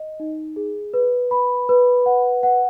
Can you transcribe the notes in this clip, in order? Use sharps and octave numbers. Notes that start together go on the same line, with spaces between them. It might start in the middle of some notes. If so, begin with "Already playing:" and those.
Already playing: D#5
D#4
G#4
B4
B5
B4
F#5
F#5